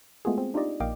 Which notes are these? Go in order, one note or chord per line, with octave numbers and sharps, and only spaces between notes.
G#3 A3 B3 F4 F#4 G#4
C4
D4 D#4 F4 G4 D5 D#5
A#1 A#3 D#5 F5 G5 D6